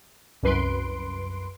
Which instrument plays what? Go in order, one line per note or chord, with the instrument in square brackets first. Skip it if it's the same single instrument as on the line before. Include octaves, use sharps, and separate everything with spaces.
[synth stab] C2 F#2 B4 C6 D7